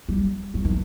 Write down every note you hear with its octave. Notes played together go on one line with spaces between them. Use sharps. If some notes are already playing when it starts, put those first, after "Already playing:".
G3
F#3
D#3